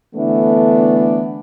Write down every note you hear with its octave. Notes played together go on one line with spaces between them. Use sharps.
D3 E3 A3 B3 D4 E4